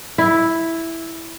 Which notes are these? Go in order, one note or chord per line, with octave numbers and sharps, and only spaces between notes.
E4